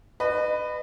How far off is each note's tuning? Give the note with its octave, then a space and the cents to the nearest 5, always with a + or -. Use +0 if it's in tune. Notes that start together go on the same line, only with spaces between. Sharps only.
B4 +10 D#5 -35